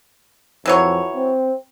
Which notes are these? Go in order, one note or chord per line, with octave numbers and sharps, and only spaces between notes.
F2 E3 F#3 C#5
C4